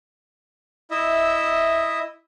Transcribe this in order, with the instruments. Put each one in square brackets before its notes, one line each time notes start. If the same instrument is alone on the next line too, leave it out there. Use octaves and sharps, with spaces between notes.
[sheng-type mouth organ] E4 D#5 E5